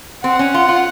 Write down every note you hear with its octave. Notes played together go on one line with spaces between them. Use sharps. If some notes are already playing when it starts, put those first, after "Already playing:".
C4 F#5
C#4
F4
F4